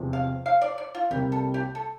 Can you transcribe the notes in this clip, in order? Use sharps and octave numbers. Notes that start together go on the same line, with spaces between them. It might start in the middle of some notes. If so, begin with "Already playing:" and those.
Already playing: E2 C3 F3 C4
F5
F5
D5
D5
F4
C2 C3 G3 A#3 G4
A4
G4
A4